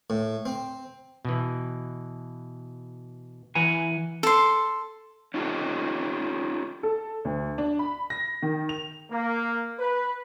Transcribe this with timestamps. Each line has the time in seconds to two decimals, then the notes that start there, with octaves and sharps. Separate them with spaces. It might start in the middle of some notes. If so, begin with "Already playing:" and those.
0.10 A2
0.46 C4
1.25 B2 E3
3.55 E3 B4 F#5 G#5 A#5
4.23 A4 C6
5.34 C#4 D#4 F4 G4 A4
6.83 A4
7.25 D2
7.58 D4
7.79 B5
8.10 A#6
8.42 D#3
8.69 F7
9.11 A#3
9.79 B4